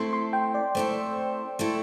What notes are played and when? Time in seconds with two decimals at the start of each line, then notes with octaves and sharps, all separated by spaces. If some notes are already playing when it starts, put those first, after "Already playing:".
Already playing: A3 C4 E4 A4 C6
0.13 C6
0.33 G5
0.55 D5
0.75 A3 C4 E4 A4 C5
1.59 A3 C4 E4 A4